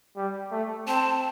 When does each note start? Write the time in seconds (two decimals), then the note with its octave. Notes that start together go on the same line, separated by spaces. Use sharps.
0.17 G3
0.52 A3
0.87 C4 A5